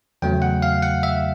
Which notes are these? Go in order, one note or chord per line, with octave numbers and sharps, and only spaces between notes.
E2 C#3 F#3 A3 G5
F#5
F5
F#5
E5